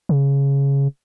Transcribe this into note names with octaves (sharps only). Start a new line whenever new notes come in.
C#3